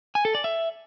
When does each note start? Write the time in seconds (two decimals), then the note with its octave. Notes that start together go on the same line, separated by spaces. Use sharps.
0.15 G#5
0.25 A4
0.35 D5
0.44 E5